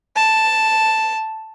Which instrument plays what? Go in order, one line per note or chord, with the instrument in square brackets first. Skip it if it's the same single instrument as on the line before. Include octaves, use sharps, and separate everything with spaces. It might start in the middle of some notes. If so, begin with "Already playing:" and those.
[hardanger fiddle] A5